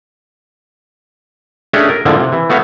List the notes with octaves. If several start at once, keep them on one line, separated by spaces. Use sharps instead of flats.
A3 C#4 D4 G4 G#4 D#5
A#4
A2 D3 F3 G#3 A#3
C3
E3
A3 B3 F#4 C#5 F5